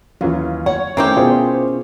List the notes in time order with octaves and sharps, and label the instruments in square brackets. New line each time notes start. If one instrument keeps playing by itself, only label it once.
[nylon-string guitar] D#2 [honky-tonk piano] E3 C#4 F4 [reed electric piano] F#3
[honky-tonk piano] C#5 [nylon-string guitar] F#5
[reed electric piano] D#3 A3 [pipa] A#3 C4 G4 [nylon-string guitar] C#4 E4 A#4
[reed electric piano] B2 F4 G#4 [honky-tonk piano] C5